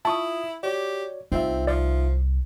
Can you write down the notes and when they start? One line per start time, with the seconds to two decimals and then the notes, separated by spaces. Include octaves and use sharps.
0.05 E4 F4 A5 C#6 D#6
0.63 F#4 G4 C#5 D5
1.32 C2 C4 D#4 F4 E5
1.67 F3 D5